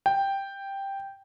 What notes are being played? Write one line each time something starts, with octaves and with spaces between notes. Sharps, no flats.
G5